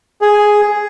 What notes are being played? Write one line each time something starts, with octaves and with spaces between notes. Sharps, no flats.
G#4